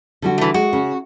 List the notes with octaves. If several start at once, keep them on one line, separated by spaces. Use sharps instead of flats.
D3 G3 F#4
E3 A3
G#3 F#4
C#3